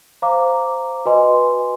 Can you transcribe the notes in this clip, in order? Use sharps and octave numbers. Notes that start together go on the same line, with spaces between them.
C5 F5 A#5 D6
F#4 B4 D#5 G#5 C6